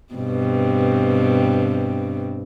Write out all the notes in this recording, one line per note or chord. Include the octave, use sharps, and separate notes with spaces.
G2 B2 C4